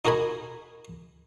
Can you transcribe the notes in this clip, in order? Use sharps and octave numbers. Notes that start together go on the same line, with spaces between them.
D#4 F#4 A#4 G#5 B5